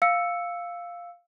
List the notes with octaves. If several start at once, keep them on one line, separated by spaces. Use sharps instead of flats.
F5 E6 C#7